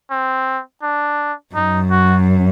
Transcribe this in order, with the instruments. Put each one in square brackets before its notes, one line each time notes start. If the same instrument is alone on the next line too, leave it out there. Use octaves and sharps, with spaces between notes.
[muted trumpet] C4
D4
[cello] F#2 [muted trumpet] D#4
[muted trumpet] F#4